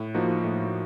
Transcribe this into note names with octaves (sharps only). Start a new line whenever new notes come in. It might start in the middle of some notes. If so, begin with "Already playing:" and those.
Already playing: A2
F3 A#3 D#4 F#4
A2